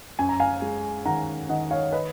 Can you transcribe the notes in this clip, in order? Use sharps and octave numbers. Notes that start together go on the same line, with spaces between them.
F#2 G#5
A#5
F5 G#5
G#3
D#3 F#5 A#5
D#3 D#5 F#5
C#5 F5
B4 D#5